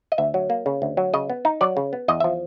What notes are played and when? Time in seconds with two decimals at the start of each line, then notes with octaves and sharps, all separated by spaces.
0.12 D#5
0.18 D2 E5
0.34 F#3
0.50 A#3
0.66 C#3
0.82 D2
0.97 F#3
1.14 C#3 D#5
1.30 B3
1.45 D#4
1.61 F#3 D5
1.77 C#3
1.93 B3
2.08 E2 D#5
2.20 F3 E5